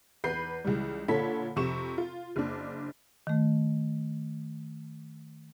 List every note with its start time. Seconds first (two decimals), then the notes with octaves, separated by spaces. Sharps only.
0.24 E2 B4 B5 G6 C7
0.64 C#2 E3 G3
1.08 A#2 D3 A4 C#5 B5 B6
1.56 F2 C3 C#6 E7
1.98 F4
2.36 F#1 D4
3.27 D#3 A3